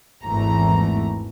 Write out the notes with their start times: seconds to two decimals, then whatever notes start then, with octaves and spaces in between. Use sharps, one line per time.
0.25 G#1 E2 E3 A3 A#5